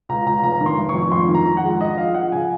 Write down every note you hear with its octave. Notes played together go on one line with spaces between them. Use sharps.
C#2 A#5
C#2 A#5
F1 A#5
D#3
C6
F1
C#6
F2
F2 C6
D#3
A#5
F2
F#5
G#3
F3 D#5
F3 F5
F3 F#5
C#3 G#5